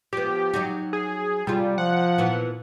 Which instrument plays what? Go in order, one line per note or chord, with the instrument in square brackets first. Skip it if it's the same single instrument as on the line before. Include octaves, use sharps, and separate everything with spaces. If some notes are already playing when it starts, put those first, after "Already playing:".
[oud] F3 B3 [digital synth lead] G4
[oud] F#3 D#4 F#4
[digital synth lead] G#4
[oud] C3 F4 [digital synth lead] G3
[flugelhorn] F3 [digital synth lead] F#5
[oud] A#2 E3 B3